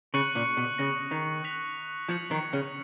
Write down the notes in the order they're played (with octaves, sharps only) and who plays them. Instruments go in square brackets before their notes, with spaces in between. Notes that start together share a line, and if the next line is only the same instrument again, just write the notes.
[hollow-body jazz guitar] C#3 [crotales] C#6 F#6 C#7 F#7
[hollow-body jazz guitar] A#2
B2
[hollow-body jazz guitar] C#3 [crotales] D#6 F#6 A#6
[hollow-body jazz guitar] D#3
[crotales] F#6 B6 F7
[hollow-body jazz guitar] F3 [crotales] G#6 C#7 F#7
[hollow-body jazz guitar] D#3
C#3